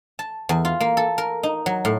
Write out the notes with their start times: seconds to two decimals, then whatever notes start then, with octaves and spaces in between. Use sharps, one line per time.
0.19 A5
0.49 E2
0.65 F4
0.81 A#3
0.97 A4
1.18 A#4
1.43 D#4
1.66 F#3
1.85 A2